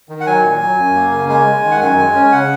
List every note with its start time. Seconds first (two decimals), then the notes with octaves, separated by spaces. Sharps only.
0.09 D#3
0.21 F#5
0.27 F#3 G#5
0.44 A#2
0.61 F#3
0.78 F#2
0.95 A#3
1.12 C#3
1.29 G#3 G#5
1.47 G#3
1.64 D#3
1.71 F#5
1.80 F#2 G#5
1.99 G#3
2.15 C#4
2.32 C#3 F#5